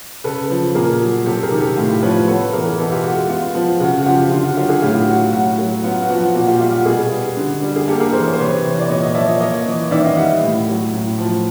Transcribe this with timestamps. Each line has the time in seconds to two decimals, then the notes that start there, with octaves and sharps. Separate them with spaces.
0.24 C#3 A4 B4
0.50 F3
0.75 A#2 G#4 A#4
1.01 F#3
1.26 C3 G4 A4
1.43 G#4 A#4
1.52 D#3
1.60 G4 A4
1.77 A2 F4 G4
2.03 F3 B4 C#5
2.28 B3 A4 B4
2.53 E3 G#4 A#4
2.79 B2 G4 A4
2.91 F4 G4
3.04 G#3 F#4
3.17 F#4
3.29 B3 F4
3.55 F3
3.80 C#3 F#4
4.02 F#4
4.06 F3 F4 G4
4.31 D3 F4
4.44 F#4
4.57 F#3 F4 G4
4.69 F#4 G#4
4.82 A2 F4 G4
5.08 F#3 F#4
5.33 A2 F#4
5.59 F#3
5.84 B3 F4
6.01 F#4
6.10 F3
6.18 F#4
6.35 A#2 F#4
6.47 F4 G4
6.56 F#4
6.60 G3 F4 G4
6.73 F#4
6.85 B2 F#4 G#4
7.11 G3
7.37 D3
7.62 G3
7.76 G#4
7.88 A#3 G4 A4
8.00 G#4 A#4
8.13 E3 A#4 C5
8.26 C#5
8.33 C5
8.38 C3 B4 C#5
8.64 E3
8.80 D5
8.89 A#2 C#5 D#5
9.02 C#5 D#5
9.15 F3 D5 E5
9.28 C#5 D#5
9.40 A#3 C#5 D#5
9.66 E3
9.91 D#3 D5 E5
10.04 D#5 F5
10.16 G3 E5 F#5
10.42 A2
10.68 F#3
10.93 A2
11.18 F3